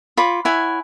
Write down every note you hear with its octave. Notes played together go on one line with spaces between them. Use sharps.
F4 C#5 B5 D6
E4 C#5 F#5 G#5